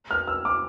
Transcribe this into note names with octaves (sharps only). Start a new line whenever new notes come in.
F6
E6
D6